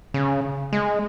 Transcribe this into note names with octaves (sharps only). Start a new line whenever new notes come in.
C#3
G#3